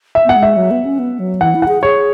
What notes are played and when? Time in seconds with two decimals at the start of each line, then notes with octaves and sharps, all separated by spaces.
0.15 E5
0.25 B3 F#5
0.36 G#3
0.43 E5
0.57 F#3
0.71 B3
0.85 C#4
0.99 B3
1.19 F#3
1.41 E3 F#5
1.55 E4
1.62 F#5
1.68 G#4
1.83 G#4 C#5